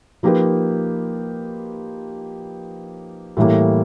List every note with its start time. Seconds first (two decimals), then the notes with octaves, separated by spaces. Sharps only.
0.23 F3 A#3 D#4 G4 B4
3.37 A2 E3 G3 A#3